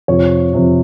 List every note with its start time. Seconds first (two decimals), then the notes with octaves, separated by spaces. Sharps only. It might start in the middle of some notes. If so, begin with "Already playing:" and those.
0.08 F2 C3 F3 C#5
0.53 F2 C3 F3